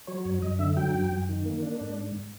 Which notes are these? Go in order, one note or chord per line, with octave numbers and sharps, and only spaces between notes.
F#3 C#5
F#2 C#5
F#2 D#5
D3 E5
F#3 G5
F#2
F#2
D#3
A#3
D4
G#2